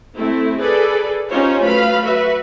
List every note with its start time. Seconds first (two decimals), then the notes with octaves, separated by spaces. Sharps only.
0.15 A3 C4 E4
0.60 G#4 A4 B4 D5
1.29 C#4 D#4 F4 G4 C5 C#5
1.64 F#3 A3 B4 F5 B5
2.03 F#4 B4 E5